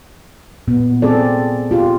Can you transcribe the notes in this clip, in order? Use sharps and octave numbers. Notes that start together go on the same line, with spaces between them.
A#2 B3
C4 G#4 A4 D5
F4 G4